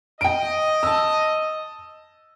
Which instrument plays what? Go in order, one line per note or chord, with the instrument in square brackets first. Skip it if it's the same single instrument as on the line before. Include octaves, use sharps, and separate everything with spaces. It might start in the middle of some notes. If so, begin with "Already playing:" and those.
[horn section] D#5 [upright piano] G5 D7
[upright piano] A5 E6